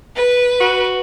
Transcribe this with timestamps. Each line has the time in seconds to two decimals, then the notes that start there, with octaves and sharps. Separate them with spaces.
0.16 B4
0.60 F#4